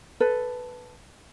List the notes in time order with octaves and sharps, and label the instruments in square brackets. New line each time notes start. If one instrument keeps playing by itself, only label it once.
[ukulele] A4 B4